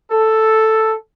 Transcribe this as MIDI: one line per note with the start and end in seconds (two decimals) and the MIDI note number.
0.12 0.96 69